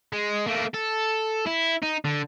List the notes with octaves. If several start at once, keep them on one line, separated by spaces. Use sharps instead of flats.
G#3
A3 A#3
A4
E4
D#4
D3